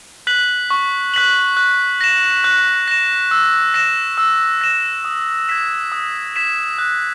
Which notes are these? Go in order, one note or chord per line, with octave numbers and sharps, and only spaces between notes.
F#6 B6 F#7
C#6
F#6 B6 F#7
F#6
A#6 E7
F#6
A#6 E7
E6
A#6 E7
E6
A#6 E7
D#6
G#6 B6 E7
D#6
G#6 B6 E7
F#6